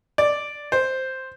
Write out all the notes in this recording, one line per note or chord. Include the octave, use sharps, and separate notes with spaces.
D5
C5